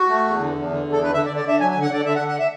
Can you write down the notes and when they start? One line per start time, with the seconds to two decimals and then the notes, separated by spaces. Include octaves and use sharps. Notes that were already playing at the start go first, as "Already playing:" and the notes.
Already playing: F#4
0.09 A3
0.24 E2
0.39 D3
0.54 E2
0.69 D3
0.84 E2
0.92 A4
1.00 D3 B4
1.14 D3 E5
1.26 D5
1.30 D3
1.37 D5
1.45 D3 E5
1.60 F#3 G#5
1.71 G#5
1.76 D3
1.82 F#5
1.90 D3 D5
2.05 D3 E5
2.16 F#5
2.21 D3
2.28 F#5
2.39 E5